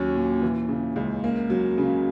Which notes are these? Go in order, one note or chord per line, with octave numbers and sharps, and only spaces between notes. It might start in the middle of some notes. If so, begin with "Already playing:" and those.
Already playing: D#2 F#3 C#4
A#2
E3
C#3
C#2
A#3
F#3
C#3